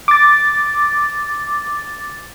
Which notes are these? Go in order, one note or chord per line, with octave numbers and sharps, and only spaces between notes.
D6 A6